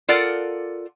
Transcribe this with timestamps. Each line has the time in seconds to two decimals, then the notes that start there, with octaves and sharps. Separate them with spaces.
0.09 F4 A4 A#4 D5 F#5